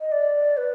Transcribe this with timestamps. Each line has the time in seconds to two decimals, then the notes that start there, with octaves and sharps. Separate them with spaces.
0.01 D#5
0.12 D5
0.57 B4